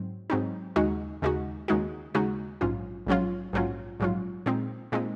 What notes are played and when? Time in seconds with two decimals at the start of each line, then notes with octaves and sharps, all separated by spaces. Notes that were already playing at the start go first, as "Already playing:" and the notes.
Already playing: G#2 F#3 C4
0.30 G#2 F#3 C4 D#4
0.76 D#2 C#3 G#3 D#4 F#4
1.22 D#2 C#3 G#3 D#4 F#4
1.68 D#2 C#3 G#3 D#4 F#4
2.14 D#2 C#3 G#3 D#4 F#4
2.61 A#1 G#2 F#3 C#4 F4
3.07 A#1 G#2 F#3 C#4 F4
3.53 A#1 G#2 F#3 C#4 F4
4.00 A#1 G#2 F#3 C#4 F4
4.46 A#2 G#3 C4 D#4
4.92 A#2 G#3 C4 D#4